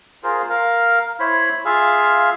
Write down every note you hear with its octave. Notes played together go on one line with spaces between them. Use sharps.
F4 G#4 A#4 C5
A#4 F5
E4 C5 C#5 B5
F4 G#4 E5 F5